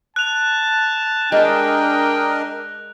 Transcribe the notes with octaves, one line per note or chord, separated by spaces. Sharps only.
A5 F#6 F7
G#3 D4 G4 A#4 D#5 G5